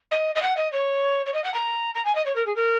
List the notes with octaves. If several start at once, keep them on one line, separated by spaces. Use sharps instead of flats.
D#5
D#5
F#5
D#5
C#5
C#5
D#5
F#5
A#5
A#5
G#5
D#5
C#5
A#4
G#4
A#4